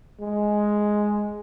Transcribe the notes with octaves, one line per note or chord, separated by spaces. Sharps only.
G#3